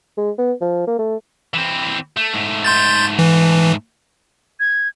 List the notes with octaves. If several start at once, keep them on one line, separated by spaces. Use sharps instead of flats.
G#3
B3
F3
A#3
A3
E3 C4
A3
G#2 A3
C6 G6 A6
E3
G#6